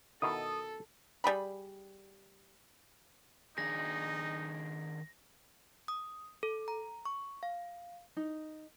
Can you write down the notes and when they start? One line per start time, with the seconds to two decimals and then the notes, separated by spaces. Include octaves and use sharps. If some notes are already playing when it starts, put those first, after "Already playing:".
0.22 B2 D#3 E4 A4 D#6
1.24 G3 G#4 B5
3.58 D#3 D4 D#4 G#4 A#6
5.88 D#6
6.43 A4
6.68 A#5
7.05 C#6
7.43 F5
8.17 D#4